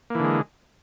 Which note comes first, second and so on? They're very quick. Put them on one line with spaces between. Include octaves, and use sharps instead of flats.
A#3 E3 D3 G#3